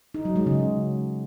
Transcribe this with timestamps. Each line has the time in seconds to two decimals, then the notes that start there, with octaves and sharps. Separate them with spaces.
0.14 D#4
0.25 F#3
0.36 G#3
0.46 C#3